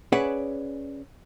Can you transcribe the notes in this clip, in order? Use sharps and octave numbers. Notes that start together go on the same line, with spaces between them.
C#4 G#4 B4 D5 E5 F#5